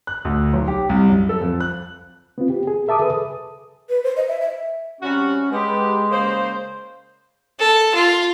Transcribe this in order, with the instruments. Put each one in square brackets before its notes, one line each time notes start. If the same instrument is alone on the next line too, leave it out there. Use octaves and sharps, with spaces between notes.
[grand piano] F#6
D2
B1
G4
C2
F#2
A4
F2
F#6
[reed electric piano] B3 C4 F4
G4
G#4
A#4 E5 A5 D6 D#6
G#4 A4 B4 D#6
[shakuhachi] B4
C5
D#5
E5
E5
[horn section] C3 G3 F#4 [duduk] C#4
[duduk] G#3 [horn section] B3 G4
[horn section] C#3 A#3 C5
[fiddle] A4
F4